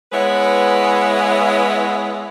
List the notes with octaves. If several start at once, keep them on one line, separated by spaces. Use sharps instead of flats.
G#3 B3 E4 B4 C#5